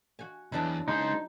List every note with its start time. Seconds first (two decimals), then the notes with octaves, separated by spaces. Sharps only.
0.19 F#4 G#5
0.52 E2 F#3 D4 E4
0.88 G#3 C#4 D#4 C5